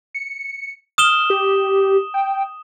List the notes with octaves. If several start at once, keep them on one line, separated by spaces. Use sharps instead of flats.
C#7
D#6 F6 E7 G7
G4
G5